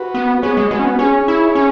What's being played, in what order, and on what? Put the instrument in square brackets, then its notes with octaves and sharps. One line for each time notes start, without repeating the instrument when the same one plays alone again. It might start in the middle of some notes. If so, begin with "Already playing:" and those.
Already playing: [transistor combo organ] F#4 B4
[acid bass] B3
[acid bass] B3 [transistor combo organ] G#4 C#5
[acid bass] G#3
[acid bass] G#3 [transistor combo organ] F#4 B4
[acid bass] C#4
B3
[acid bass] C#4 [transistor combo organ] G#4 C#5
[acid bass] E4
C#4